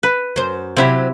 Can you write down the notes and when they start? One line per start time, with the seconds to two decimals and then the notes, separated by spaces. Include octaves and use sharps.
0.03 B4
0.36 F#2 C5
0.77 C3 F#3 C4 E4 G4